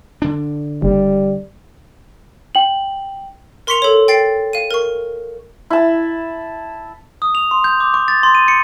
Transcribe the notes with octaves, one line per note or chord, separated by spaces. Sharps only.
D3 D4
F#1 G3
G5 F#7
A#4 C6 C#6 B6 C#7 F7
A4 C#5
G5 A6 C7
F5 D#7
A#4 C#6
E4 A5
D#6
F7
C6
G6
D6
C#6
A6
C6
D#7
C#7